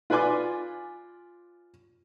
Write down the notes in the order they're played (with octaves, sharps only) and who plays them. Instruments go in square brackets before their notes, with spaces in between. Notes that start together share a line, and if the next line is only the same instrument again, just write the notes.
[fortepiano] F4 B4 D5 G#5 C6 D6